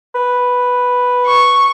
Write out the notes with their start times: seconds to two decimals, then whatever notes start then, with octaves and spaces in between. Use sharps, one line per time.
0.15 B4
1.26 C#6